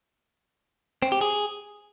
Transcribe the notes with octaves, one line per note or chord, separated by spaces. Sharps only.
C4
G4
G#4